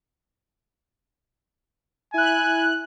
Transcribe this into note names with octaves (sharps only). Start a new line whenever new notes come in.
E4 G#5 F#6